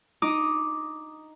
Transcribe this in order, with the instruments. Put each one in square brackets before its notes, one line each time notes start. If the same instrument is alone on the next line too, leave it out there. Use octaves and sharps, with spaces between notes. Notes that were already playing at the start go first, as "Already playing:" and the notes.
[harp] D#4 D6 D#6